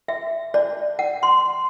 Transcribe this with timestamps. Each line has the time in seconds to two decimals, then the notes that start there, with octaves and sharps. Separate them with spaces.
0.08 E5
0.54 D5
0.99 F#5
1.23 C6